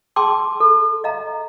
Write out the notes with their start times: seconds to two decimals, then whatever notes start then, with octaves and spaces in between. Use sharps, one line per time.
0.16 G#4 G5 A5 C6 D6 E6
0.60 A4
1.04 D#5 F5 A#5